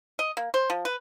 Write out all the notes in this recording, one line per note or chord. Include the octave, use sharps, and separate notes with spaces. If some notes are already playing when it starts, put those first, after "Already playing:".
D#5
A#3
C5
F3
B4